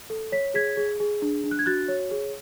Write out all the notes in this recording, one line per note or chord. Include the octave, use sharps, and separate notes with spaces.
A4
C#5 B6
G#4 G#6 B6
G#4
G#4
D4
D4
F#6
G#6
F#4 F#6 A6
C#5
G#4